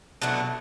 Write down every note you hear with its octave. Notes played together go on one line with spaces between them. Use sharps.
B2 F#3 A3 D4